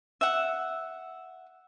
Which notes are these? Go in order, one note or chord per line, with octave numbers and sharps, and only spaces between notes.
E5 F#5